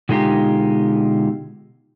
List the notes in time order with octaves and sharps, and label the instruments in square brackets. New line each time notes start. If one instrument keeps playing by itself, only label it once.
[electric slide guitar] B2 D3 G#3 D#4 F4 G4